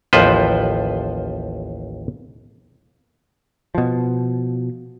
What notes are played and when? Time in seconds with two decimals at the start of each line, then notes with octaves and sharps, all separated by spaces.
0.13 A1 D#2 F3 B4 C5
3.75 B2 F3